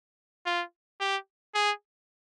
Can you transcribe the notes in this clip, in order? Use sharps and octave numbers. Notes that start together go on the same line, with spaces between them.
F4
G4
G#4